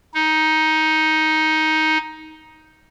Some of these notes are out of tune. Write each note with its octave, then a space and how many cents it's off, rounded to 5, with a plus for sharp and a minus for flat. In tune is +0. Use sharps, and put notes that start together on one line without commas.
D#4 +10